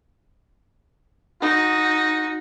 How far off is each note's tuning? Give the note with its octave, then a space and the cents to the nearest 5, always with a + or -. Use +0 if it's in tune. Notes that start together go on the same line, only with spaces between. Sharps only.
D#4 +0 F#4 -20